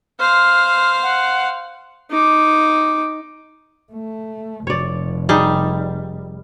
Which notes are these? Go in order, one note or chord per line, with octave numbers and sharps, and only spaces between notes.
C5 F5 F6
F#5
D#4 D6
A3
F1 C#5 D5
G3 D#4 G#4